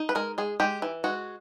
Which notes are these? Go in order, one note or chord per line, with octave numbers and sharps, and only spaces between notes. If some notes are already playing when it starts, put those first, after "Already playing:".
Already playing: D#4
B4
G#3 A#4
G#3 G#4
G#3 G4
E3
G#3 F#4